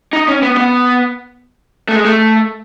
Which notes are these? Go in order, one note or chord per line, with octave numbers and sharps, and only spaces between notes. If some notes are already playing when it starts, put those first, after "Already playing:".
D#4
C#4
B3
B3
A3
G#3
A3